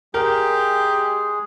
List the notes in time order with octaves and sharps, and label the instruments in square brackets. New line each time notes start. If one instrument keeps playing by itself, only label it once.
[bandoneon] G#3 G#4 [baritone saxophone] G4 [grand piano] A#4